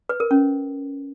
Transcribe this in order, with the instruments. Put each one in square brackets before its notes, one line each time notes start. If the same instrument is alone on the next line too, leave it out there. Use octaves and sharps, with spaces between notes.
[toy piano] B4
A#4
C#4